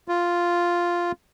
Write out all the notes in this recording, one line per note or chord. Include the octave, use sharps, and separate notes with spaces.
F4